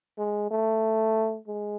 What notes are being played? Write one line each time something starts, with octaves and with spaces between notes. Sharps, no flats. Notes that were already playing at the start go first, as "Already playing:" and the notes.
G#3
A3
G#3